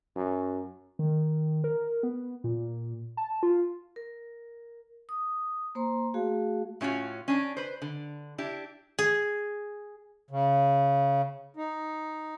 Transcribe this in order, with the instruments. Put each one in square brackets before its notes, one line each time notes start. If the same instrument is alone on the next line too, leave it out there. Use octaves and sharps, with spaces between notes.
[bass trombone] F#2
[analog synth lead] D#3
A#4
B3
A#2
A5
F4
[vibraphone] A#4
D#6
A#3 C5 A#5 C6
A3 F#4 G#4 F5
[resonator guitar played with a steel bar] A2 C#4 F4 F#4
C#4 D4
B4 C5
D3
D4 E4 G4
[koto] G#4
[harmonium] C#3
D#4